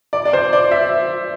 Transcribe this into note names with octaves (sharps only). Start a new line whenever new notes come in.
D5
D5
C5
D5
E5